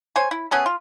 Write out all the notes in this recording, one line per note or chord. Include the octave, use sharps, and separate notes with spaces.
C5 C#5 G#5
E4
B3 C#4 G#4 A4
F4